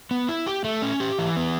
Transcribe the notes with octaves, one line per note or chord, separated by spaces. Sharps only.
B3
E4
G4
A3
C#4
G4
E3
B3